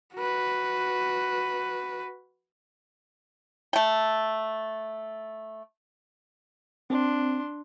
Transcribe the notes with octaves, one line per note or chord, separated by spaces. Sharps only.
F#4 B4
A3 G5
C4 D4 C6